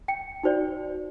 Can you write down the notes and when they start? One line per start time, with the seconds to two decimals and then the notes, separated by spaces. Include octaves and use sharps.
0.08 G5 C#7
0.43 D#4 F#4 C5 D5